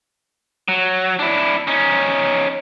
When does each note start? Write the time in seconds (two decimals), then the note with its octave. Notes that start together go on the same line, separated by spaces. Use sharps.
0.68 F#3
1.19 D4 E4
1.67 C#4 D#4